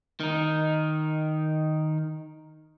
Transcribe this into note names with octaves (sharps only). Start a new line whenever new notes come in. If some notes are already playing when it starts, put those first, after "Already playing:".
D#3 D#4